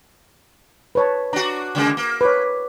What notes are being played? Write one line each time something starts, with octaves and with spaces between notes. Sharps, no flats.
B4 C#5 A5
D4 F#4 A#5
C#3 G#3 A#3
A#3
B4 C#5